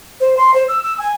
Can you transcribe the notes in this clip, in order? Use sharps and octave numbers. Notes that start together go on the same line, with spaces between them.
C5
C6
C5
E6
E6
G#5